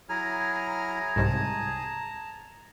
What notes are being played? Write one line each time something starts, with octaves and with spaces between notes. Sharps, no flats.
F#3 E4 G#4 G#5 A#5 F6
C2 G#2 C3 A5